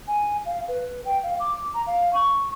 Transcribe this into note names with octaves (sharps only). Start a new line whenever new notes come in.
G#5
F5
B4
G5
F5
D6
A#5
F5
C#6